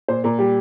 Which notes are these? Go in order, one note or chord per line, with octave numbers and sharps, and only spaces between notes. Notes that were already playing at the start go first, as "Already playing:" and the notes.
A#2 C5
A#2 A#4
G3 G4